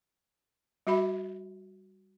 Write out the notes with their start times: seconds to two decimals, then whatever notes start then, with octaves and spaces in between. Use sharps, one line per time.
0.87 G3 F#4 E5 B5